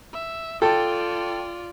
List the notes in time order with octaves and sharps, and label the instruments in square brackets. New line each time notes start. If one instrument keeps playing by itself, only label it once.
[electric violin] E5
[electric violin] F4 D5 [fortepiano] A4 G5 A5